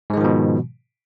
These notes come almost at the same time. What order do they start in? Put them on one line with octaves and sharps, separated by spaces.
G#2 G#3 D#3 F3 B2